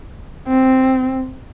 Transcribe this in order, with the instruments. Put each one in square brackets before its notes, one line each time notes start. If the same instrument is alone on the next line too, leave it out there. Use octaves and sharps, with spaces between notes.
[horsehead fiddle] C4